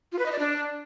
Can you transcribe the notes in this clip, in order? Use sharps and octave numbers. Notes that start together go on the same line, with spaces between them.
F4
B4
D#5
D5
D4